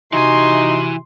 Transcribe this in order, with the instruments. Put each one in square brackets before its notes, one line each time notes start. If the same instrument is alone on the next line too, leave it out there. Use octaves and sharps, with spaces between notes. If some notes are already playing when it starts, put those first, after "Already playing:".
[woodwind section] C3 F#4 [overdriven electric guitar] E3 G#5 [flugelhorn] D#4 [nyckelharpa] C6